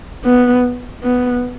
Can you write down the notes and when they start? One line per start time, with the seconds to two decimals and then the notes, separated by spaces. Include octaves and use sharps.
0.25 B3
1.03 B3